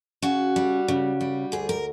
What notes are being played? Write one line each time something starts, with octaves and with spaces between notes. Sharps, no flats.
C#3 F#4
G3
C#3
G3
D2 G#4
A#4